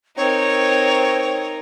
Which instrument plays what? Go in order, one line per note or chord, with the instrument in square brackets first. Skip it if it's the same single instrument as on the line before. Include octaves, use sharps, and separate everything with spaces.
[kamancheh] C4 [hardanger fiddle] D#4 A#4 [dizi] C#5